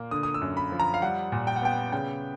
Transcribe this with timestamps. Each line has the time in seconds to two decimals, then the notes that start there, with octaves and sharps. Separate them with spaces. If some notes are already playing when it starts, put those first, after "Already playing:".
Already playing: A#2 A#3
0.11 D3 D#6
0.23 D#6
0.34 E6
0.42 F#2
0.57 B5
0.72 F3
0.80 A#5
0.94 F5
1.02 G3 F#5
1.32 A#2
1.47 G5
1.56 F#5
1.62 B3 G5
1.92 C#3 G5